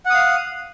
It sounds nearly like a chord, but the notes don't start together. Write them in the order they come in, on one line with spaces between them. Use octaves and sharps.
F#5 D#6 F5